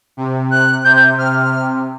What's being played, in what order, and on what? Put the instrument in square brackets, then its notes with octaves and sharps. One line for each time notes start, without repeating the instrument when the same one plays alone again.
[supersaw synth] C3
[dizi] F#6
[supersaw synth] C3 [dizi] G6
[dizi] G6
[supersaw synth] C3 [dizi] F6